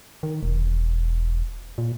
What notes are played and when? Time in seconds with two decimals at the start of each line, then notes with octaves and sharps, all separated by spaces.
0.23 D#3
0.43 E1
1.78 A#2